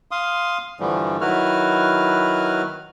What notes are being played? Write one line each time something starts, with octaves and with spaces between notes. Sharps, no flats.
F5 C6 D#6
G2 D3 E3 F3 G3 A3
D#3 F#3 E4 F#4 B4 F6